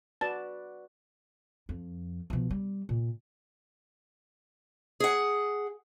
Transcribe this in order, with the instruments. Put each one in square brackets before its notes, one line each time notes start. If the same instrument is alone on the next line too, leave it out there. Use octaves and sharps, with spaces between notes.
[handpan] F#4 B4 D5 [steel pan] A5
[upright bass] F2
B2 F3
G3
A#2
[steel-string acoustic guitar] G#4 F#5